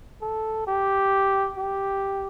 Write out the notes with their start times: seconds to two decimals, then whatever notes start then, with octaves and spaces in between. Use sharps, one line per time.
0.22 A4
0.67 G4
1.58 G4